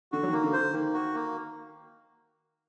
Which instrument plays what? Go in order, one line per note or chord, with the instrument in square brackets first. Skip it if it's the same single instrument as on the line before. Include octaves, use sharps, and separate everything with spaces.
[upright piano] D3 [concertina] F#4
[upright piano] F#3
[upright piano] D#3 [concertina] A#3
[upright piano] D3
[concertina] C5
[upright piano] D3
[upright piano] D#3 [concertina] A#3
[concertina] F#4
A#3